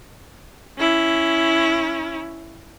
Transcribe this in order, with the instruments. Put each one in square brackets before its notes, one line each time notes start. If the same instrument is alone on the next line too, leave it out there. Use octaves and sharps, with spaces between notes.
[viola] C#4 E4